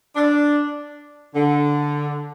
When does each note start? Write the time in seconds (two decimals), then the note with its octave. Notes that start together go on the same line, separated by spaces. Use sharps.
0.16 D4
1.34 D3